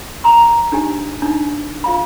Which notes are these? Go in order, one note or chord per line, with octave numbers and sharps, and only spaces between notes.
A#5 C6
D4 D#4 G4 G#5
D4 D#4
F4 F5 B5